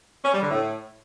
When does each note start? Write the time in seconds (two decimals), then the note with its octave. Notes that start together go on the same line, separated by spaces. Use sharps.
0.25 C#4
0.33 G3
0.42 D3
0.51 A2